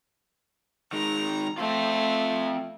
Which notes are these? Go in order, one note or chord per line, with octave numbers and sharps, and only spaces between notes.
D#3 G#3 A#5
A3 C4 F4